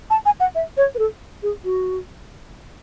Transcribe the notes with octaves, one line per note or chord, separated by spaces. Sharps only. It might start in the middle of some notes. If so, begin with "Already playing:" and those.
A5
G#5
F#5
E5
C#5
B4
A4
G#4
F#4